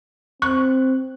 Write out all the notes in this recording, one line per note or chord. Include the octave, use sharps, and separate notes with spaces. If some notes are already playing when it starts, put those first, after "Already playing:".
C4 C#6 F#6